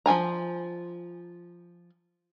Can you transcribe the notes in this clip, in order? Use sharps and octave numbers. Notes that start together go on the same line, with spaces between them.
F3 F#3 G#5 A#5